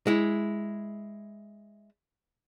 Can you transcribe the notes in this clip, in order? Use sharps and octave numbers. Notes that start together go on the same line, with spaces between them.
G#3 E4